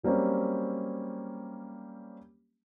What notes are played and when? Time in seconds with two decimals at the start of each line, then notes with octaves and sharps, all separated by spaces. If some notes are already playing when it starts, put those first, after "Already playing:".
0.03 F#3 G3 A#3 C4 C#4